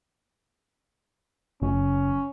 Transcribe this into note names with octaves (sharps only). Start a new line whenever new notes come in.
F#1 C#4